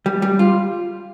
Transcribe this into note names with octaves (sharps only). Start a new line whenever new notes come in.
G3
G3
F4